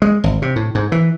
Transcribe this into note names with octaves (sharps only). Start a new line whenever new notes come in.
G#3
G#1
C3
A2
G#2
E3